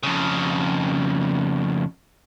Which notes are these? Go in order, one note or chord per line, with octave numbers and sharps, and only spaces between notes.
F2 C#3